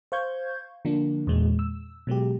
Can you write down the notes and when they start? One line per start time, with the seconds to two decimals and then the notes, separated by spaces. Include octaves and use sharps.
0.12 C5 F5 C#6 G6 G#6
0.85 D3 F3 A#3 D4
1.27 E2 A#2 G#3
1.59 E6
2.07 B2 F#3 G#3 G4